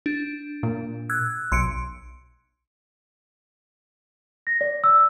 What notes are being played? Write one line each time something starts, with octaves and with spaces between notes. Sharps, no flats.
D4
A#2
E6 F#6 G#6
B1 C6 C#7 D7
A#6
D5
E6